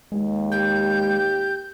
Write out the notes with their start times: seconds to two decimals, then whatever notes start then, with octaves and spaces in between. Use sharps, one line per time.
0.12 D#2 G#3
0.52 G4 G6